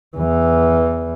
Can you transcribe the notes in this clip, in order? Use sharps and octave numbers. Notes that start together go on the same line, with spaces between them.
E2 E3